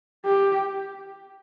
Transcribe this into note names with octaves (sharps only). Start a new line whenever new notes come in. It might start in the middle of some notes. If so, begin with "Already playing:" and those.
G4